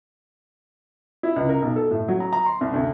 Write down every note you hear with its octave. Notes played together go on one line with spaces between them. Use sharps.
E4
C#2
A#4
B1
A4
A2
F#3
A#5
A#5
C6
C2
D2